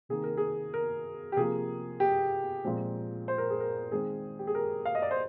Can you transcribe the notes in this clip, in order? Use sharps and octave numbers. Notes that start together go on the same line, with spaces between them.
C3 D#3 A#3 G#4
A#4
G#4
A#4
G4
C3 F3 A#3 G#4
G4
A#2 F3 G#3 C4
C5
A#4
G#4
A#4
D#3 G#3 C4 G#4
G4
G#4
A#4
F5
D#5
D5
C5